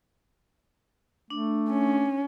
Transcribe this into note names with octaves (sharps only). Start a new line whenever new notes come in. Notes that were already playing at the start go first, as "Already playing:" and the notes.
A3 D4
C#4